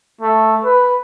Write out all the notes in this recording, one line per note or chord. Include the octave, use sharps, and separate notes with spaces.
A3
B4